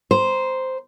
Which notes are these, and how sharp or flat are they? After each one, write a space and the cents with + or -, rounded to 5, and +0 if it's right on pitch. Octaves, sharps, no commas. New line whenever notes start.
C5 -5 A#5 +30